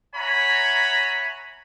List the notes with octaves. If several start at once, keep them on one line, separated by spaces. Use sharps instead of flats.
C#5 E5 F#5 G#5 A#5 B5